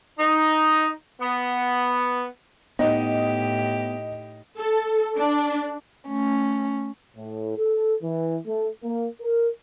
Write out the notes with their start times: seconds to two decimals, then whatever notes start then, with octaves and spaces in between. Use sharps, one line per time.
0.19 D#4
1.22 B3
2.79 A2 B3 D#4 G4 D#5
4.57 A4
5.17 D4
6.07 A3 C#4
7.17 A2
7.57 A4
8.03 E3
8.47 A3
8.83 A#3
9.21 A#4